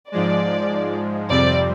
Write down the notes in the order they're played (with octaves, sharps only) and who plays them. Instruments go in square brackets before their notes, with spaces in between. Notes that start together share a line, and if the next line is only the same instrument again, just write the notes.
[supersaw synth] G#2 F3 G#3 [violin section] D5
[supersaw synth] F2 C3 G3 C4 [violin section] D5